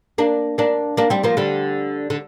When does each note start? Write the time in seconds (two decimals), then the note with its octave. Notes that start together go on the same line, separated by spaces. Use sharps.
0.18 A#3 D4
0.58 A#3 D4
0.97 A#3 D4
1.10 G3 C4
1.24 F3 A#3
1.37 D3 G3
2.10 D3